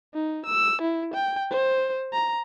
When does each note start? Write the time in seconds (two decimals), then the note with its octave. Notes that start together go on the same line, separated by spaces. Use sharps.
0.14 D#4
0.46 E6
0.82 E4
1.14 G5
1.51 C5
2.13 A#5